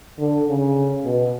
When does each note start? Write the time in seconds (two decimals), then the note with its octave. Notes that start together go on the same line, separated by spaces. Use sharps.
0.18 D3
0.47 C#3
1.04 B2